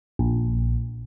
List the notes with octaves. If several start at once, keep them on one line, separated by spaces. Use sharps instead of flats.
A#1